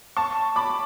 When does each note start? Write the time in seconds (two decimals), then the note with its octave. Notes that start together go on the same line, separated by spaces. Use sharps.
0.17 A5 C#6
0.56 B5 D6